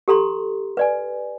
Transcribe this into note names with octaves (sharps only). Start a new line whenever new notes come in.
G4 A4 A#5 C6
B4 D5 G#5